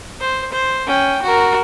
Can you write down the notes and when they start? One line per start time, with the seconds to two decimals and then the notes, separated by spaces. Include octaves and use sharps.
0.20 C5
0.52 C5
0.87 C#4 G5
1.23 F#4 A#4